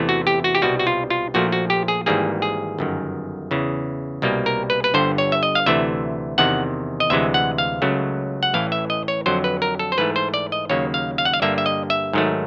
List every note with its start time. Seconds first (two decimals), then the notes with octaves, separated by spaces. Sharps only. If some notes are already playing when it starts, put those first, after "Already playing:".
Already playing: E2 C3 E3 A3
0.09 F#4
0.27 G4
0.44 F#4
0.55 G4
0.62 C2 B2 G3 F#4
0.79 F#4
0.87 F4
1.10 F4
1.34 A#1 A#2 F3 A3 F#4
1.52 F#4
1.70 G4
1.88 G#4
2.06 G#1 G#2 E3 G3 A#3 G#4
2.42 G#4
2.79 G1 F#2 D#3
3.51 E2 C#3 E3
4.22 C2 B2 G3 A#3
4.46 A#4
4.70 B4
4.84 B4
4.94 G1 G2 D3 C5
5.18 C#5
5.32 E5
5.43 D#5
5.55 F5
5.66 D2 C3 E3 A3 E5
6.38 E2 C3 D#3 F#5
7.00 D#5
7.10 D2 C3 E3 G#3 E5
7.34 F#5
7.58 F5
7.82 C#2 C#3 F#3 A3
8.43 F#5
8.54 A1 A2 E3 F5
8.72 E5
8.90 D#5
9.08 C#5
9.26 F2 D3 F#3 C5
9.44 B4
9.62 A#4
9.79 A4
9.92 C5
9.98 G#2 E3 A3 B4
10.16 C5
10.34 D5
10.52 D#5
10.70 D#2 C#3 F#3 A#3 C#5
10.94 F5
11.18 F5
11.25 F#5
11.34 F5
11.42 G2 D3 G3 A#3 E5
11.58 E5
11.66 D#5
11.90 E5
12.13 G#2 D#3 F#3 A3